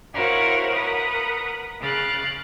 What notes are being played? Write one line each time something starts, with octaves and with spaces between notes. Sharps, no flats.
E4 F#4 A#4 C5 C#5 F5
A#4 B4 F#5 D#6
C#3 F5 F#6 A6